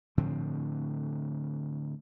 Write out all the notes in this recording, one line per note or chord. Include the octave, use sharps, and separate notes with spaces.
A2 D3 F3 C4